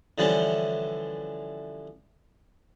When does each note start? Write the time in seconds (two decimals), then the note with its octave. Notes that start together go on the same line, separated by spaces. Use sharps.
0.18 D3 E3 F3 G3 C#4